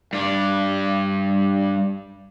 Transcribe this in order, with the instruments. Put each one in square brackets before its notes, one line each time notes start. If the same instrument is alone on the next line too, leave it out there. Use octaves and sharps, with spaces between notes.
[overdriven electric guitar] G2 D4